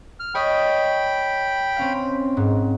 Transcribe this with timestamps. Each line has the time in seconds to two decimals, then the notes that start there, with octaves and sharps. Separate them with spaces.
0.20 F6
0.35 C#5 D#5 G5 B5 D#6
1.76 C4 C#4 F5
2.37 G#2